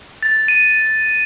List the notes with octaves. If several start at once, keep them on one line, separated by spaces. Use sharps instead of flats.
A6
D#7